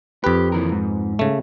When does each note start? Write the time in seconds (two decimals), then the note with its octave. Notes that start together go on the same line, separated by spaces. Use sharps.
0.24 F2 G4 B4
0.52 D#2 E3 A#4
0.72 G#2
1.19 C#3 A3